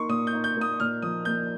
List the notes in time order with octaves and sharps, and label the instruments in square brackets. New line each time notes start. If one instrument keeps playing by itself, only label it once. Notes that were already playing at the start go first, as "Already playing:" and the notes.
Already playing: [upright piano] A#3 D#4 [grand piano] C6 C#6
[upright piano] A#2 [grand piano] D#6
[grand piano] G6
[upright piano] D#4
[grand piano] G6
[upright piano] A#3 [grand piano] D#6
[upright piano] A#2 [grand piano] F6
[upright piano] F3 [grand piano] D#6
[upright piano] A#3 [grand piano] G6